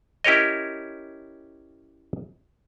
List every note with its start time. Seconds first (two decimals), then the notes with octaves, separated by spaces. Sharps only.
0.24 C#4 E4 G4 A#4 C#5 D#5